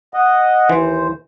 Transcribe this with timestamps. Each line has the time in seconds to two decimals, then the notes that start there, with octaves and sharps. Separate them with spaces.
0.14 D#5 F#5
0.69 D#2 E3 C5